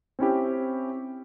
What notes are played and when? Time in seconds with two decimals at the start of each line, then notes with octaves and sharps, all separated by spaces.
0.19 C4 C#4 E4 G4